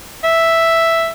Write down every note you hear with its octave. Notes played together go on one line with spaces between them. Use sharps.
E5